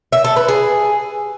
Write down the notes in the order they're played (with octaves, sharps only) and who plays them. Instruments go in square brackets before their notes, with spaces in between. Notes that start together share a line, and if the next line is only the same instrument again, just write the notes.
[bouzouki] E5
A4
B4
G#4